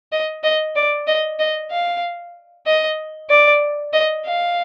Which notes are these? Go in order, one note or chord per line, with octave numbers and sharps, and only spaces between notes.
D#5
D#5
D5
D#5
D#5
F5
D#5
D5
D#5
F5